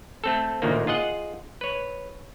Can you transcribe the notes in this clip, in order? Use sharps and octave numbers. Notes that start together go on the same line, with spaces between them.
A3 C4 A4
A1 D2 A#2 D#3 A#3
F4 G#4 D#5 F#5
B4 C#5